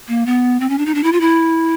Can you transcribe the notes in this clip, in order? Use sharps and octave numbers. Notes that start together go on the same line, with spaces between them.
A#3
B3
C4
C#4
D4
D#4
D4
E4
F4
E4